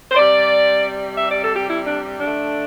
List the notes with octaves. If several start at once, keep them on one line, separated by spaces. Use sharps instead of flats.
C5
C3 G3 D5
E5
D5
A4
G4
E4
D4
D3 A3 D4